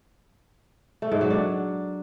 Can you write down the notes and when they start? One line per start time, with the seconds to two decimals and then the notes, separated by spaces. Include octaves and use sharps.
1.02 A3
1.12 G#2
1.21 F#3
1.30 D4